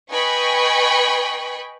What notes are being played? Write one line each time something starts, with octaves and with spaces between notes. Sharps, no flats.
B4 D#5 G5 G#5 B5 C#6